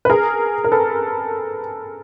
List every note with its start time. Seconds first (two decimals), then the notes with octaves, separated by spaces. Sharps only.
0.05 B4
0.10 G#4 A#4
0.64 A#4
0.72 A4 B4